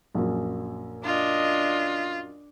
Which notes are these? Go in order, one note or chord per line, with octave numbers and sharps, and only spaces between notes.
A#1 F#2
D4 F4 D#5